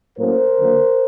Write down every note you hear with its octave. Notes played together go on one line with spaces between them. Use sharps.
A2 F#3 A#3 C#4 A#4 C5
D3 F#3 A#3